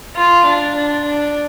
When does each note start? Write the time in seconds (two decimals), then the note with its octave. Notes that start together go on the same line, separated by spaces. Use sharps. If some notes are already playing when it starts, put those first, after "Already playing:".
0.16 F4
0.46 D4
0.76 D4
1.05 D4